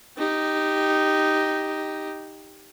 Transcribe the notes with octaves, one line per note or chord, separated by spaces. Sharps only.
D#4 G4